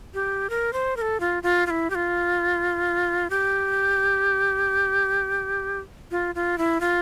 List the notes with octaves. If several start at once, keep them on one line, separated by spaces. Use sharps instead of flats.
G4
A#4
C5
A#4
A4
F4
F4
F4
E4
G4
F4
G4
F4
F4
E4
F4